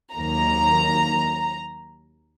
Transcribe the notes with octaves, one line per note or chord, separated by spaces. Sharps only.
D#2 D#3 F#3 A#3 A#5